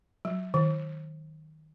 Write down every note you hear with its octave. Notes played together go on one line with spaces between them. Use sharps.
F#3
D#3